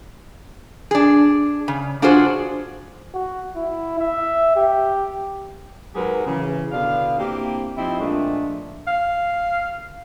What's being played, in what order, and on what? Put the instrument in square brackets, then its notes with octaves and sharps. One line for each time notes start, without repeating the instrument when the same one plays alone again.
[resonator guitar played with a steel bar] D4 G#4
C#3
D4 F4 F#4 G#4 A4 C5
[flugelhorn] F#4
E4
E5
G4
[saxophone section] G#2 F#3 G4 G#4 A#4 B4
C#3 E3
B2 D3 D4 F5
A#3 C4 D4 E4 G4
F3 C4 D#4 E4
A#2 F3 G#3 A3 D4
[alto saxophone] F5